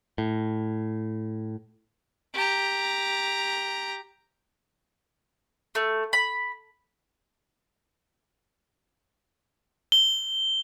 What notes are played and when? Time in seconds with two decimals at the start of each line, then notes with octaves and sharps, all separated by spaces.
0.18 A2
2.34 G4 A#5
5.75 A3
6.13 B5
9.92 G7